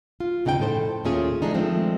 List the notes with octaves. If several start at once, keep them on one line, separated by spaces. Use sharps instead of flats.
F4
D2 C#3 D#4 F#5 G5
F2 A2 C#3 A4 C5
D#2 A#2 A3 C#4 F4 G#4
F3 F#3 G#3 A3 D4 D#4
D#3 F3 G#3 A3 C4